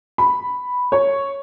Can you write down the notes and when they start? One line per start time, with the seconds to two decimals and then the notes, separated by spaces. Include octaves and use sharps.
0.18 B5
0.92 C#5